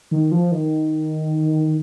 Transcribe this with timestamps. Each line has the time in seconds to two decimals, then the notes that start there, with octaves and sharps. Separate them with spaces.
0.11 D#3
0.31 F3
0.52 D#3